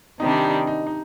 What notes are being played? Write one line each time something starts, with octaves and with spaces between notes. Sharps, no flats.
C3 D#3 G3 D4 D#4
D#4
D#4
D#4